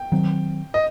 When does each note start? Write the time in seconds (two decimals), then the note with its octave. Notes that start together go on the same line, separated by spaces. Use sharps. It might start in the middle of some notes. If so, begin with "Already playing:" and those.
Already playing: G5
0.12 D#3 F#3 C4
0.74 D#5